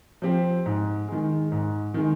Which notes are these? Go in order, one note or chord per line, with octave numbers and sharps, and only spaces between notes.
F3 C4 G4
G#2
D#3 G#3
G#2
D#3 G#3